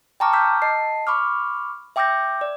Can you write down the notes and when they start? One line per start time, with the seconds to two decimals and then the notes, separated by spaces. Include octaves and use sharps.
0.20 G5 A5 A#5 C#6 D6 F6
0.33 D6 E6 F6 G6 B6
0.62 D#5 A5 C7
1.07 B5 C#6 D6 F6
1.96 E5 G5 D6 E6 G6 A#6
2.41 D5